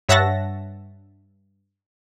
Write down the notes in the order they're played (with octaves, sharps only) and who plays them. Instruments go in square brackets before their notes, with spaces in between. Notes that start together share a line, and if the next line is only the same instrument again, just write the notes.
[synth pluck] G2 C#5 E5 F#5 A5 A#6